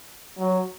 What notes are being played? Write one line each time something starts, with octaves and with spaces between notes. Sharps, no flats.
F#3